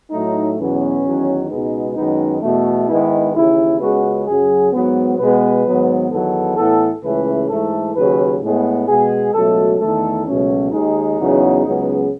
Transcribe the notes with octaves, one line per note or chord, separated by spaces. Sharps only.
A2 F#3 A3 D#4
E2 B2 F#3 B3 C#4
E2 D#3 F#3
C#2 B2 G#3 B3 D#4
F#2 D#3 G#3 B3 D#4
E2 B2 A3
G#2 D#3 G#3 B3 E4
D#2 C#3 E3 E4
C#2 C#3 G#3 B3 F#4
F#2 C#3 F#3 G#4
G#2 F#3 B3
B2 G#3 B3 B4
G#2 D#3 F#3 B3
E2 D#3 F#3 B3 A4
A2 E3 B3 A4
C#2 C#3 E3 A3 B4
G#2 E3 A3 A4
D#2 C#3 F#3 B4
A2 G#3 B3
B2 G#3 B3 G#4
C#2 B2 F#3 A3 A4
E2 D#3 A3 A4
C#2 B2 F#3 A3 C#4
D#2 D#3 G#3 D#4
E2 C#3 F#3 B3
C#2 C#3 F#3 B3